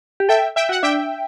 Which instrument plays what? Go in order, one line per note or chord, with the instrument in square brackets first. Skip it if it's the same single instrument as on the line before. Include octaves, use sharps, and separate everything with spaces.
[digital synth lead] G4
[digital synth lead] A4 [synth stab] E5 G5
[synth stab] E5 G5
[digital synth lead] F#4 [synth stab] F#5
[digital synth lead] D4 [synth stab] E5 G5